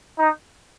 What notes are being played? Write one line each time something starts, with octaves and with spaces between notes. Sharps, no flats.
D#4